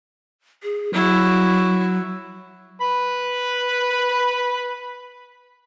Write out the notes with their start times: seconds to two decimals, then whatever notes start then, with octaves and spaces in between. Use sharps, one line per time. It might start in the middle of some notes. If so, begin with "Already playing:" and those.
0.63 G#4
0.94 F#3 E4 F#4
2.82 B4 B5